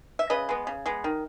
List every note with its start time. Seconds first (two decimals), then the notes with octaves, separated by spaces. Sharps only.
0.19 E5
0.30 C#3 B4 D#5
0.49 G#3 B3
0.67 C#3
0.86 G#3 B3
1.04 D#3